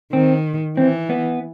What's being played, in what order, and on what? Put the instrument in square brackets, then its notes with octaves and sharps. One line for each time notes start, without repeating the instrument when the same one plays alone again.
[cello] D#3 [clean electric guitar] C4
[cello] E3 [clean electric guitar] C4
[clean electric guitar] B3